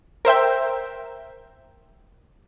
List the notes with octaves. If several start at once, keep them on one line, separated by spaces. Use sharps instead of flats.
A#4 C5 E5 G5